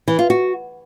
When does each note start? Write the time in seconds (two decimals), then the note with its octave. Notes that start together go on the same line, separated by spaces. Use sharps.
0.08 E3
0.19 F4
0.30 F#4